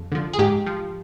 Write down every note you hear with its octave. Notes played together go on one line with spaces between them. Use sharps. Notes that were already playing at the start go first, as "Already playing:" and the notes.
Already playing: F2
D3 F3
G#4
G#2 G4
F3